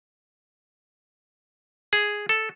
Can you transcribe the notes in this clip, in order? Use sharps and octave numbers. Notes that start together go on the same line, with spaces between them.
G#4
A4